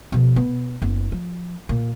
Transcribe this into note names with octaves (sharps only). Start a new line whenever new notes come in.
B2 F3
B3
F#1 B3
F3
A#2